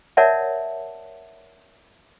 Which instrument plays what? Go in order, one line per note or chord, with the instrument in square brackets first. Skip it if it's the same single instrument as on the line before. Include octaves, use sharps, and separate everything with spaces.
[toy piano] A#4 C#5 D5 E5 F#5 A5